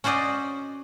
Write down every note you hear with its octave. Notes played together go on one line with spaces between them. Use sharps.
C#4 F#4 C5 D5 D#5